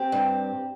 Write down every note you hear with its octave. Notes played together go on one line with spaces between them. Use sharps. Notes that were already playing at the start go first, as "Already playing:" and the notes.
Already playing: C4 G4
G2